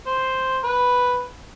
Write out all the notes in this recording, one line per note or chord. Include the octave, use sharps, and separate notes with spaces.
C5
B4